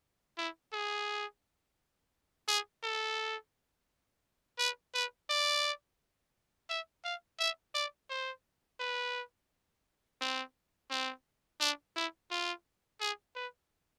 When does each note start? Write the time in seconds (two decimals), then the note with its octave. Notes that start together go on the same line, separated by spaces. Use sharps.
0.38 E4
0.73 G#4
2.48 G#4
2.83 A4
4.59 B4
4.94 B4
5.30 D5
6.70 E5
7.04 F5
7.39 E5
7.75 D5
8.10 C5
8.80 B4
10.21 C4
10.91 C4
11.60 D4
11.96 E4
12.31 F4
13.01 G#4
13.36 B4